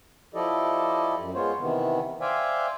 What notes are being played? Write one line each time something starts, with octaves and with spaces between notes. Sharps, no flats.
F3 E4 G4 A4 D5 D#5
F#2
G#3 B3 F4 C5 C#5
C3 D#3 E3 B3
C5 D5 E5 F5 G5 G#5